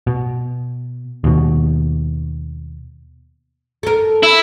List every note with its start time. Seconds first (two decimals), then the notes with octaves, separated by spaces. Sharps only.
0.07 B2
1.24 D#2 B2
3.83 A4 A#4
4.23 E4